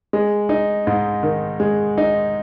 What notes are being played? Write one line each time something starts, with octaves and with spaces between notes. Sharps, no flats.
G#3
D#4
G#2
D#3
G#3
D#4